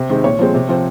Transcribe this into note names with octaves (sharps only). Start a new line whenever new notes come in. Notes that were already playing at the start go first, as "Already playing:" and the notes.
Already playing: C3
D#3 G#3 C4
A#2 C#5
F3 G#3 C4
C3
F3 C4